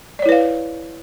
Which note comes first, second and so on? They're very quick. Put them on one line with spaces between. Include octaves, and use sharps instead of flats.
D5 C#5 E4 B4 F5